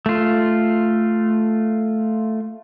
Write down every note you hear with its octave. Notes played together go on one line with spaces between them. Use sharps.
A3 F4